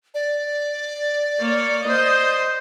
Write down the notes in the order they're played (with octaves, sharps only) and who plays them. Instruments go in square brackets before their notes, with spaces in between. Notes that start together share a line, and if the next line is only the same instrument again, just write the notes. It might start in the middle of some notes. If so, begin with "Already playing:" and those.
[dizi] D5
[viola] A#3 C#5
C5 D#5